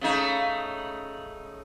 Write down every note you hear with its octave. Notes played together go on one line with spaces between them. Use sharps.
C#3 A3 D#4